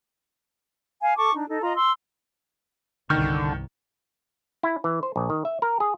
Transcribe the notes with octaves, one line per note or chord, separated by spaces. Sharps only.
F5 G#5
A4 A5 C#6 D6
D4 D#4
D#4 A4
F4 D#5 A#5
C6 E6
G1 C2 D3 D#3 C#6 F6 G6
E4
E3
C5
A#1
D#3
E5
A#4
G#4